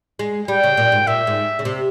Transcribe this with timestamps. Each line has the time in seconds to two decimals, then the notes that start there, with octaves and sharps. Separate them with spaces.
0.19 G#3
0.48 G3 G5
0.63 C#3
0.77 A#2
0.92 G#2
1.07 A#2 E5
1.27 G#2
1.59 C#3
1.65 C3